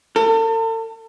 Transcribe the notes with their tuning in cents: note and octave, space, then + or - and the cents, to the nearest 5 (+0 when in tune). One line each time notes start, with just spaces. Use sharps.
A4 +40